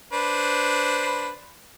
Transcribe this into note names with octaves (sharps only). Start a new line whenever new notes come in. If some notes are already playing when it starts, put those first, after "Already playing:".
D4 B4 C5